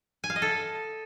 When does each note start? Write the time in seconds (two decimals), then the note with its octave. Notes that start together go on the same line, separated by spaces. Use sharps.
0.24 G#5
0.30 F5
0.36 D#5
0.42 A4